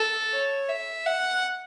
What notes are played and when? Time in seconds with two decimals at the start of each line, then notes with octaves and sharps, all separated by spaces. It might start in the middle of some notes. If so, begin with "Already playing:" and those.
Already playing: A4
0.33 C#5
0.69 E5
1.06 F#5